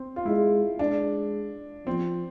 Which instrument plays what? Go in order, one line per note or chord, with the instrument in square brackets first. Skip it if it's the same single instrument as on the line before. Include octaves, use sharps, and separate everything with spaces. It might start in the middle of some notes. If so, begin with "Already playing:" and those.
Already playing: [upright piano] C4
F4
[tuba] G#3 [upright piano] E4
[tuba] G#3 [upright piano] D4
[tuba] F3 [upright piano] C4